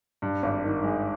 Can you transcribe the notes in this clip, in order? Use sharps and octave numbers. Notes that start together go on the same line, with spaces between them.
G2
G#1
D#3
G#3